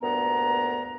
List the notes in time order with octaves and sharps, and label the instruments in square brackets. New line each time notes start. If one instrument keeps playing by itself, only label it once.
[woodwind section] D2 G2 A#2 B3 A#5